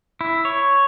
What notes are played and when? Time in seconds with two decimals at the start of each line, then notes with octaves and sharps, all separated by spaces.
0.21 E4
0.45 C#5